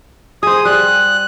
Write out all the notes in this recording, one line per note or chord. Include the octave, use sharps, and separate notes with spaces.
G#4 C5 D#6
G3 F#6